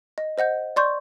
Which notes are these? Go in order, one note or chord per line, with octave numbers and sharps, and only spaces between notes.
D#5
C5 D#5 F#5 G6
D5 C6 C#6 G6